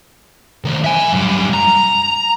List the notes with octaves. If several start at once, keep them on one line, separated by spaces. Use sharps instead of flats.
D#3 A3
E5 G#5
F#2 G3
A#5